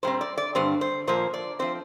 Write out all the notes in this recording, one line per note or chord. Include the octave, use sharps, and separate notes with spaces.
A#2 G3 C4 C5
D5
D5
G2 D3 G3 C4 C5
C5
A#2 F3 A#3 C5
D5
F3 C4 C5